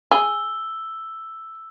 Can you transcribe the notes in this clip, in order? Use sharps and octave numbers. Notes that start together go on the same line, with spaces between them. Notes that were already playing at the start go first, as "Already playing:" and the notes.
G#4 E6 G7